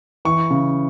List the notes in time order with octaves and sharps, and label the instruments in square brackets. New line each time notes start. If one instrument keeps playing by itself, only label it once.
[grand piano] E3 C#6
C#3